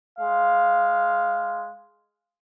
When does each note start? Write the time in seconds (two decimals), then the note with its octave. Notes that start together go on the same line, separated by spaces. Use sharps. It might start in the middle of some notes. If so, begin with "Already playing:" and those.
0.18 G#3 F5